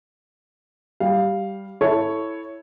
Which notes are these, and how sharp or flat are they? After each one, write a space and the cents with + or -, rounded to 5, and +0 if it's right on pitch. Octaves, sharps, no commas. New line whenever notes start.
G3 +0 F5 +0
E4 -5 A4 +0 C#5 +0